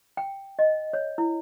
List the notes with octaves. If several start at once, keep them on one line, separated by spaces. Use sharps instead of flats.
G5
D#5
C#5
E4